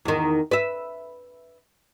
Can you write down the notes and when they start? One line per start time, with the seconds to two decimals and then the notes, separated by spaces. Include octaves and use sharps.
0.05 E2 D#3
0.51 B4 E5